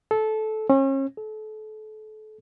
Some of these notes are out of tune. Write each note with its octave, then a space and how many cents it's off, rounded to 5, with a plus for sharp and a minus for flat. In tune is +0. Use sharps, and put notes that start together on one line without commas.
A4 -15
C#4 -35
A4 -30